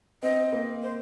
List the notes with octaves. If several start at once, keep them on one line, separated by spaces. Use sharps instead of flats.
C4 D#5
A#3
C5